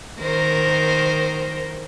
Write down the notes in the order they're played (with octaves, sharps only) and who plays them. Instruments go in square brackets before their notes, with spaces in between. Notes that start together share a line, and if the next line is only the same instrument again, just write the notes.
[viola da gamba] D#3 A#4 C5